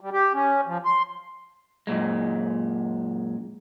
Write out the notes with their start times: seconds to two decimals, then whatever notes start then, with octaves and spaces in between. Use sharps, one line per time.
0.01 G3
0.13 G4
0.33 C#4
0.67 F3
0.85 C6
1.87 F#2 A#2 G#3